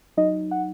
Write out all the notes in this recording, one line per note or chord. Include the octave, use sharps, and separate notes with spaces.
F#3 D#4 D#5
F#5